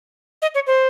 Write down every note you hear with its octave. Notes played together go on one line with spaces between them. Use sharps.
D#5
C#5
C5